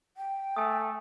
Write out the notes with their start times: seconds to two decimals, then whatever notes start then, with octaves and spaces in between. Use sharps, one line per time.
0.17 G5
0.56 A3 G#5 D#6